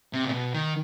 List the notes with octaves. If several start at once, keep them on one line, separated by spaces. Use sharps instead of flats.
C3
A#2
B2
D#3